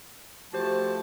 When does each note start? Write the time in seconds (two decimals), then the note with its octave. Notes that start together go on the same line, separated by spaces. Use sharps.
0.53 F3 A3 F#4 G4 C5 A5